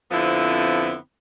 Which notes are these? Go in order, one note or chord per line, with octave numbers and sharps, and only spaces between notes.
F2 D3 F3 B3 C4 E4